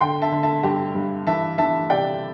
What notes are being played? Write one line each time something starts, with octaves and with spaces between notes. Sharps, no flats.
D3 G5 C6
E5 A5
D3
E5 A5
G2 G4
G2
E3 E5 A5
E3 E5 A5
C3 D5 G5